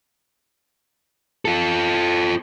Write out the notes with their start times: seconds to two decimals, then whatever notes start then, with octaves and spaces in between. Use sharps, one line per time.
1.45 F4 A4